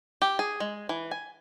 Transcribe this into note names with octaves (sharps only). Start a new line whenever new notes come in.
G4
G#4
G#3
E3
G#5